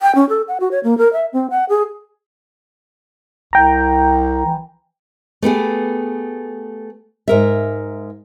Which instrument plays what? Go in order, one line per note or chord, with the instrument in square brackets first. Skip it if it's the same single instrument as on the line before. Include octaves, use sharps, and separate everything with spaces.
[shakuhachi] G5
C#4
A4
F#5
F#4
C#5
A#3
A#4
E5
C4
F#5
G#4
[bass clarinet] C2 [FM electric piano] G5 A#5
[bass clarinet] E3
[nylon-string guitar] A3 B3 G4 G#4
G#2 A#4 E5